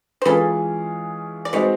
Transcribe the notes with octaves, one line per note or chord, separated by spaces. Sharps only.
C5
E3 G#3 C#4 F4 G#4 A4 B4
D5
G#3 C4 D#4 F#4 B4 C#5